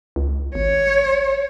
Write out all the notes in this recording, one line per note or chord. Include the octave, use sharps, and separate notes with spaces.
C#2
G#1 C#5